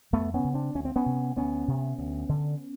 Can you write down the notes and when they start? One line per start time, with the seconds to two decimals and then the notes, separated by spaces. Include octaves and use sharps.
0.13 F2 A3 B3
0.34 B3 C#4
0.44 C#3
0.54 C4 D4
0.75 D2 C#4
0.85 C4
0.96 B3 C#4
1.06 C3
1.37 D2 B3 C#4
1.68 C3
1.98 D2
2.29 D3